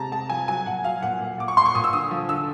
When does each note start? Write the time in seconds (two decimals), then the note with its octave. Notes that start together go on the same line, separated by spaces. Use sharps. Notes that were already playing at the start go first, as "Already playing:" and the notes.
Already playing: C3 G#3 A5 A#5
0.12 G#3 A5
0.29 F3 G#5
0.48 F#3 G#5
0.66 A#2 F#5
0.84 F#3 F5
1.02 A#2 F#5
1.21 A#2
1.38 A#2 D6
1.48 C#6
1.57 A#2 C6
1.66 C#6
1.75 A#2 D#6
1.84 E6
1.93 D3 D#6
2.11 F3
2.29 D3 E6